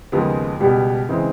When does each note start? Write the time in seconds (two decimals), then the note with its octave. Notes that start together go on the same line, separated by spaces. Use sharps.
0.12 D#2 C#3 F3 G#3 B3
0.60 C#2 B2 G3
1.09 C#3 E3 G#3 C4